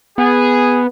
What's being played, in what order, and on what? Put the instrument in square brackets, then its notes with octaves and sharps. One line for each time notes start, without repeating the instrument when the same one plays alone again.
[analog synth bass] B3 [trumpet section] G#4